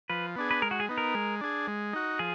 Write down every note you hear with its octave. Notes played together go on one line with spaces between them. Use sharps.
F3 B4
B3 D4 G#4
B4
G#3 A#4
F#4
G#4
B3 D#4
A#4
G#3
D4 G#4
G#3
D#4 F#4
F3 G#4